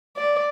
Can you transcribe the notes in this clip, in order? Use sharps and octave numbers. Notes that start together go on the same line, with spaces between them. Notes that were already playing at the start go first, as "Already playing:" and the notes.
D5